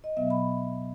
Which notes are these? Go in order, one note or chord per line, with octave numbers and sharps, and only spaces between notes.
D#5
B2 F#3 B3 E5
B5